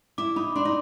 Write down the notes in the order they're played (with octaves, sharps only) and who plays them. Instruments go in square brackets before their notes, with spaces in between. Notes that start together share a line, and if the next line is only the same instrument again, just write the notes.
[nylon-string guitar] E4 [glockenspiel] D6
[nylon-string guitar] D#4 [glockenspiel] B5
[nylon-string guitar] D4 [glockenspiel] C6
[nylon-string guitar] D#4